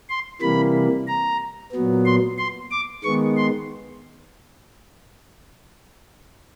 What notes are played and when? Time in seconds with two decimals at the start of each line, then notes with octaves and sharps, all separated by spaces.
0.09 C6
0.41 C3 E3 G3 A#3 B5
1.08 A#5
1.73 A#2 F#3 B3
2.05 C6
2.38 C6
2.71 D6
3.04 D#3 G#3 B3 C#6
3.37 C6